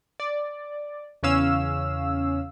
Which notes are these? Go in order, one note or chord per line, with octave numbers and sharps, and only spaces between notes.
D5
E2 C#3 C#4 F5 E6